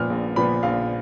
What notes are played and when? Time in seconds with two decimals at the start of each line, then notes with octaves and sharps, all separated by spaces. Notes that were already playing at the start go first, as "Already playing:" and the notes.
Already playing: A#2 F3 B3 F6
0.10 A#1
0.36 A#2 F3 B3 B5
0.63 A#1 F5